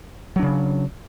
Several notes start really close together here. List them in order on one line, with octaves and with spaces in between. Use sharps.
F#3 D4 C#3